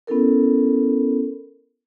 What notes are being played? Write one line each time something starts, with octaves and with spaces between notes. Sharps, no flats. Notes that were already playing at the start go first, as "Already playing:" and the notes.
B3 C#4 E4 A4 A#4